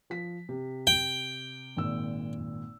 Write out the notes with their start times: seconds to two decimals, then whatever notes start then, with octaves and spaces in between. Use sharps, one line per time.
0.10 F3 B6
0.49 C3
0.87 G5
1.77 G#1 A#2 E6